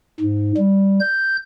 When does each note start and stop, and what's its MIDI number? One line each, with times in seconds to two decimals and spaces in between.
0.20 0.52 44
0.57 0.99 55
1.00 1.37 91